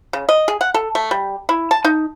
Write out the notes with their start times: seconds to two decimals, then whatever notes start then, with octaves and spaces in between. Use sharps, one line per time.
0.13 C#3
0.29 D#5
0.48 G#4
0.61 F#5
0.74 A4
0.95 A3
1.11 G3
1.49 E4
1.71 A5
1.85 D#4